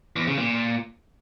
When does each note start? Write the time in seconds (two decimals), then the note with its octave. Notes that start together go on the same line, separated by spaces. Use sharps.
0.16 E2
0.27 C#3
0.38 A#2